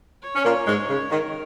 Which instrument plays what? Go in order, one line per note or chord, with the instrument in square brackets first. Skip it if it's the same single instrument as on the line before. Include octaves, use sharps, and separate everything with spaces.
[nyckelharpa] C#5
[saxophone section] C#4
A#2 A#3
G#2 G#3
C#3
[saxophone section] D#3 [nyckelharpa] A#4